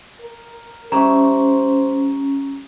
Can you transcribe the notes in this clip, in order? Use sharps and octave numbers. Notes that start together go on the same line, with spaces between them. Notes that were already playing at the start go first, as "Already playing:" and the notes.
A#4
G3 A3 C#4 E4 C5 A#5 C#6